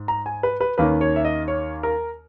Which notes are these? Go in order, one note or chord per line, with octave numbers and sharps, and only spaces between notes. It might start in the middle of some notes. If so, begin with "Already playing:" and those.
Already playing: G#2
A#5
G#5
B4
B4
D#2 D#3 A#3 C#4 B4
C#5
E5
D#5
C#5
A#4